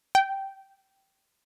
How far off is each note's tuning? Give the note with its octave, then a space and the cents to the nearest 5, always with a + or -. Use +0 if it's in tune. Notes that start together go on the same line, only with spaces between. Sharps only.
G5 -10